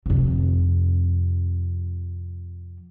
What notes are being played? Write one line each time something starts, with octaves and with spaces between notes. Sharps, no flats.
F2 C3